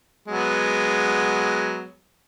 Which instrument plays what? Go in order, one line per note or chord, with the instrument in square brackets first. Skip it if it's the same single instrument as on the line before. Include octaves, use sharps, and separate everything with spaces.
[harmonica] F#3 G#3 B3